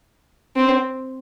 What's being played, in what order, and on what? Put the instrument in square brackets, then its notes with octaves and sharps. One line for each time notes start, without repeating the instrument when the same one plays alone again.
[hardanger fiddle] C4